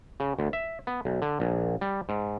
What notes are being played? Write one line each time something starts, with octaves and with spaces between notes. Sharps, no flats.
C#3
D2
E5
B3
B1
D3
A#1
G3
G#2